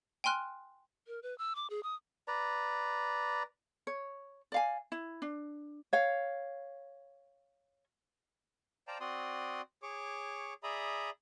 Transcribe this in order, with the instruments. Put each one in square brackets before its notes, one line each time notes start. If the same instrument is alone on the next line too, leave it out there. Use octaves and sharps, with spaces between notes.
[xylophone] G5 G#5 C6 F6 F#6
[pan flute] A#4
B4
E6
D6
G#4
D#6
[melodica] B4 D5 A#5
[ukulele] C#5
D5 F5 G#5
E4
D4
C#5 F5
[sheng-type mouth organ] C5 D5 F5 G5 A5 A#5
C4 F#4 D5 C6 D#6
G#4 C#5 C#6 D6
G#4 D5 E5 A#5 B5 D#6